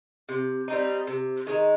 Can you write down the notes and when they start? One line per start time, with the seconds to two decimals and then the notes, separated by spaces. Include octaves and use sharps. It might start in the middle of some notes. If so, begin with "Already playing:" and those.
0.29 C3
0.68 G3 C4 D#4
1.07 C3
1.47 D#3 G#3 D#4